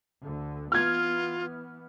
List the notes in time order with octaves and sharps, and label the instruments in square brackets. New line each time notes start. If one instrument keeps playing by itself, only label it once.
[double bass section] D2 D3
[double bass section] E3 B3 [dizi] F4 [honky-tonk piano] F6 G#6